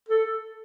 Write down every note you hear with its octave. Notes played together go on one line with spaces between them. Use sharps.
A4